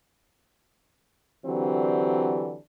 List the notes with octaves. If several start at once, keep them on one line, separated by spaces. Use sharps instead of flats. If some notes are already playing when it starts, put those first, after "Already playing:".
D3 E3 F#3 C4 D4 G4